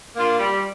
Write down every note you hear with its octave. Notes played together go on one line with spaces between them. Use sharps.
A#3 D4 F4
G3